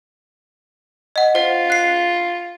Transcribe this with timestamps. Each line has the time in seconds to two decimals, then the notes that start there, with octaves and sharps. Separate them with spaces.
1.16 D#5 F#5
1.35 F4 C5 F#5
1.70 F#6 C7